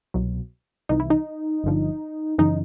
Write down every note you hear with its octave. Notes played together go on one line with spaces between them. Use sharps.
C2 B2 F#3
C2 C3 E3 D#4
E4
D#4
G1 G2 D3 F3
F#2 C#3 E3 D#4